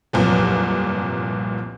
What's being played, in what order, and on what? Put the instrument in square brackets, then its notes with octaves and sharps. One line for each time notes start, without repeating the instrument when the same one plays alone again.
[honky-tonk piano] G1 C2 F2 A#2 F#3